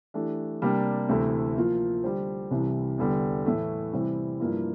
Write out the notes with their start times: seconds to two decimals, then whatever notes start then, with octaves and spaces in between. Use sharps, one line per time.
0.14 E3 A3 D4 G4
0.62 C3 G3 A#3 D4
1.09 D2 C3 E3 A3 E4
1.57 F3 A#3 F4
2.03 D3 G3 D4 G4 C5
2.51 C2 C3 E3 G3
2.98 E2 D3 G3
3.46 A2 E3 A3
3.92 C3 E3 G3 C4 E4
4.40 G2 F3 A#3 E4